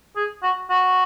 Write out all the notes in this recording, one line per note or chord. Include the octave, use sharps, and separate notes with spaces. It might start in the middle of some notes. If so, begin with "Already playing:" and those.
G#4
F#4
F#4